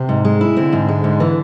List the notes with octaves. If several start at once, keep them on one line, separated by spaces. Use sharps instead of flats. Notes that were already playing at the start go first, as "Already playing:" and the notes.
Already playing: C3
G#2
G#3
E4
D3 C4
G#2
G#3
G#2
E3